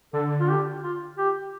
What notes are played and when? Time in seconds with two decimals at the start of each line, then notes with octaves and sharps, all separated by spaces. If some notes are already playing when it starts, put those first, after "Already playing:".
0.13 D3 A4
0.40 F4
0.49 G4
0.83 F4
1.18 G4